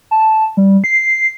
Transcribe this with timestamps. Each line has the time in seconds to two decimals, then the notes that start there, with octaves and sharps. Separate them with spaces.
0.11 A5
0.57 G3
0.84 C7